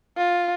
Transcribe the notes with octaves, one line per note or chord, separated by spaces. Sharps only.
F4